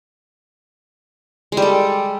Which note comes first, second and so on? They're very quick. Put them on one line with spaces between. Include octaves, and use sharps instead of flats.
G#3 G3 A4